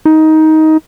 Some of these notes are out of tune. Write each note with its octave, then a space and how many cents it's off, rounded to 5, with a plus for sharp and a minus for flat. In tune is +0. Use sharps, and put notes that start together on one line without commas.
D#4 +15